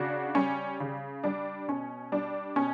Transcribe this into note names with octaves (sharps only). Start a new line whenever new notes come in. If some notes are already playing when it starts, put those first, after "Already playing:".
Already playing: C#3 D4 F#4
G3 C#4
C#3
G3 D4
B2 C#4
G3 D4
B2 C#4